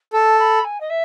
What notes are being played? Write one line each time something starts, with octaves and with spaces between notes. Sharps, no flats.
A4 A5
B5
G#5
D#5
E5